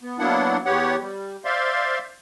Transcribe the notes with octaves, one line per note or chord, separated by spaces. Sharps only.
B3
F#3 A#3 B3 D4 E4 F#5
E2 B3 G4 C#5 F#5
G3
C5 D5 E5 F5 C6